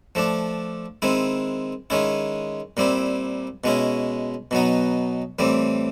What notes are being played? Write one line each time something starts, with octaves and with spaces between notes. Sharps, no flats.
F3 A3 D4
D#3 G#3 C4 E4
D#3 G#3 C#4 E4
A#2 G3 C4 E4
B2 G#3 C#4 E4
B2 F#3 B3 D#4
A2 E3 G3 C4